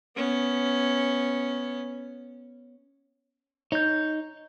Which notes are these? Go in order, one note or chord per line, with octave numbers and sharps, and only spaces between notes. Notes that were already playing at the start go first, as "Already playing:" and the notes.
B3 C#4
D#4 C#5 G6